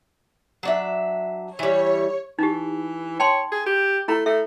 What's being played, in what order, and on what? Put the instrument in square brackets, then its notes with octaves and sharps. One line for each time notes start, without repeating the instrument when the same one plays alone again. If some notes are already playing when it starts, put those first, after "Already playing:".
[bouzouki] F#3 D4 E5
[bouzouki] E3 G3 [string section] C#5
[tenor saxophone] E3 [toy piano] D#4 G4
[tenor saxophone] C#5 [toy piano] G5 A5 C6
[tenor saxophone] G#4
G4
[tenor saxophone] A3 [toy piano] E4 A#5 B5
[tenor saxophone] A3 [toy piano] A4 E5